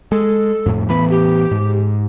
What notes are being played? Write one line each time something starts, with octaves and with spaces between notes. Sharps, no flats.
G#3 A4
F2 A2
A2 E3 B3 B5
G4
G#2